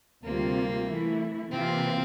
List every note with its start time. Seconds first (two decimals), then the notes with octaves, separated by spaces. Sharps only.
0.24 D2 C3 G3 A#3 C4 F4
0.87 E3 A3 E4
1.51 C3 E3 A#3 C4 F4